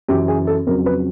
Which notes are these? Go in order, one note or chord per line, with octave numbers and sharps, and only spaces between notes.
F#2 C#3 E3 G4
G#4
A4
F2 C#3 F#3 A#4
B4